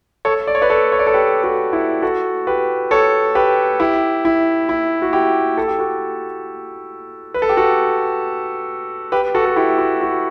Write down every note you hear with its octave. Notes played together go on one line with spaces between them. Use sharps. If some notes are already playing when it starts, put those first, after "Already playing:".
A4 C#5
D5
C#5
B4 D5
A4 C#5
C#5
D5
A4 C#5
G4 B4
F#4 A4
E4 G4
F#4 A4
G4 B4
A4 C#5
G4 B4
E4 G4
E4
E4
F#4
E4 G4
A4
G4
F#4 A4
B4
A4
G4
F#4 A4
G4 B4
F#4 A4
A4
E4 G4
F#4
F#4